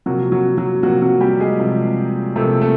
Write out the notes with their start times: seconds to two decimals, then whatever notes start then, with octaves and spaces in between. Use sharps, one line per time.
0.06 C3 F3 F#3 A#3 F#4
0.32 F#3 F#4
0.57 F#3 F#4
0.83 C3 F3 F#3 A#3 F#4
1.02 F#3 F#4
1.21 G3 G4
1.40 G#3 G#4
1.59 C3 F3 A#3
2.36 C3 F3 A3 A#3 A4
2.61 A3 A4